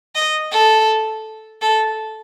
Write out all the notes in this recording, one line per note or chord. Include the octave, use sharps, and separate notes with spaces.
D#5
A4
A4